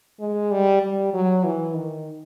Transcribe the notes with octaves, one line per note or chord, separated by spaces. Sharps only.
G#3
G3
G3
F#3
E3
D#3